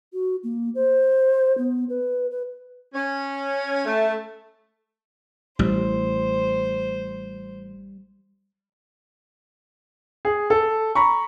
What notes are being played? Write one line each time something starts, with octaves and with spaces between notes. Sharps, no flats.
F#4
A#3
C5
B3
B4
B4
C#4
A3
A1 G3 C5
G#4
A4
A#5 B5 C#6